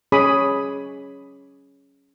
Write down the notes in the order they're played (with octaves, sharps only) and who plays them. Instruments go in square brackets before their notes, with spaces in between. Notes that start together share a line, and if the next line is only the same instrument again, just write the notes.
[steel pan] C#4 G#4 C#5 B5 D6 D#6